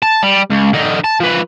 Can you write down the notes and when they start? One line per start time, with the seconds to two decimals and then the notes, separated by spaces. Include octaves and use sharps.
0.03 A5
0.23 G3
0.50 C#2
0.73 D3 D#4
1.04 A5
1.20 F3 B4